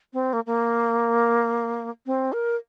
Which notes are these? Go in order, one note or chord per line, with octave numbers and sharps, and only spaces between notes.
C4
A#3
A#3
C4
A#4